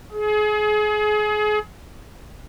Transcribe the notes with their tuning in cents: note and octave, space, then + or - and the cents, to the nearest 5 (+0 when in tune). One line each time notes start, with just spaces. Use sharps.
G#4 +30